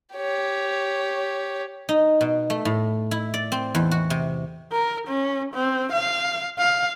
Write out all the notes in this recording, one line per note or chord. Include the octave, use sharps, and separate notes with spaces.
G4 C#5
D#4
B2
A3
A2
E4
D5
C4
E2
F#4
C3
A#4
C#4
C4
F5
F5